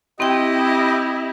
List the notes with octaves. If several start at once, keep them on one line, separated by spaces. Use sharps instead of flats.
C4 E4 G4 D#5 G5